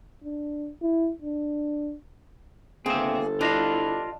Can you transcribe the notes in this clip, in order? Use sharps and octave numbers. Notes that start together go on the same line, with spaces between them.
D4
E4
D4
G1 A#3 C4 G#4 A4 E5
D4 E4 F4 D#5 F5